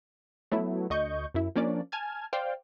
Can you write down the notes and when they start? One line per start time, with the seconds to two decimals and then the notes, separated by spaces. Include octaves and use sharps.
0.52 F#3 A3 B3 E4
0.90 D2 D#5 C#6 G6
1.34 F#2 E4
1.56 F3 A#3 C#4 D4 D5
1.92 G#5 A5 F6 G#6
2.33 C5 D5 F5 G5